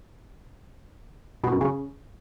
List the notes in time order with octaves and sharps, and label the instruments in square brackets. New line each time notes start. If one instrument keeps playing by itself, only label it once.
[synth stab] B2
F#2
C#3